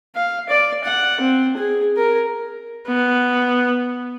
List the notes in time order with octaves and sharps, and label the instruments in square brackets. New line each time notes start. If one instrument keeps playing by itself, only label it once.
[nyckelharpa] F5
D5
F#5
C4
G#4
A#4
[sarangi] B3